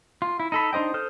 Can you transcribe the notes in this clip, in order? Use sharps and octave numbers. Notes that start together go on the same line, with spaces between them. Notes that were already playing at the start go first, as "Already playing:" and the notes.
F4
E4
D#4 A4 B5
D4 D#4 C5 D#5 G5
A4 C5 D#6 F6 G6